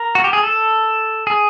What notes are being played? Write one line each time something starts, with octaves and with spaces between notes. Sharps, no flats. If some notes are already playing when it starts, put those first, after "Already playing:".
Already playing: A#4
F#4
G4
G#4
A4
G#4